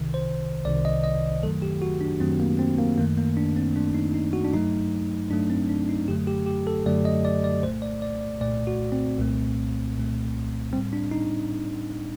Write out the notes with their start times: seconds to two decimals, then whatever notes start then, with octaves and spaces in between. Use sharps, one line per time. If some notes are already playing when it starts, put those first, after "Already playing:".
Already playing: C2 C3 D#3
0.14 C5
0.65 C2 C3 D#3 D5
0.85 D#5
1.04 D#5
1.43 F#2 D#3 F#3 A3 A4
1.62 G4
1.82 F#4
2.01 D4
2.20 F#2 D#3 F#3 A3 C4
2.40 A#3
2.59 C4
2.79 A#3
2.98 F#2 D#3 A3 A#3
3.17 A#3
3.37 D4
3.56 C4
3.76 F#2 D#3 A3 D4
3.94 D#4
4.14 D#4
4.33 F#4
4.44 D4
4.53 G2 F#3 A3 D#4
5.30 G2 F#3 A3 D4
5.50 C4
5.69 D4
5.89 D#4
6.08 F#2 D3 F#3 A3 G4
6.27 G4
6.46 G4
6.67 A4
6.86 F#2 D3 F#3 A3 D5
7.05 D#5
7.25 D5
7.44 D5
7.63 C2 A#2 A3 C5
7.82 D5
8.02 D5
8.21 D5
8.41 C2 A#2 A3 D5
8.67 F#4
8.92 C4
9.18 C2 A#2 A3
9.96 C2 A#2 A3
10.73 G3 C4
10.78 A2
10.93 D4
11.11 D#4